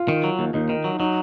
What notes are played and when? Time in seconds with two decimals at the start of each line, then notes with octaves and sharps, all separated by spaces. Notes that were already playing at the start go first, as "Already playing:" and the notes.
Already playing: F4
0.08 D#3
0.24 F#3
0.39 D#2
0.53 D#2 D#4
0.69 D#3
0.84 F#3
0.99 F#3 D#4